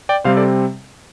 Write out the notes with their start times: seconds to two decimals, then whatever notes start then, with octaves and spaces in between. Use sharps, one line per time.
0.09 D5 G5
0.24 C3 G3 C4 C5 F5
0.37 A4 D5